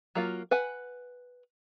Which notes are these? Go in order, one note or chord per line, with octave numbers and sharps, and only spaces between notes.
F#3 A#3 F4
B4 F#5 G#5